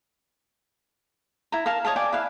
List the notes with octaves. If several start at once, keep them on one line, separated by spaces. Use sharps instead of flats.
E4 A#5
A#4 F5 A5
C#5 D#5 F5 A5
D5 G5 G#5
E4 B4 F5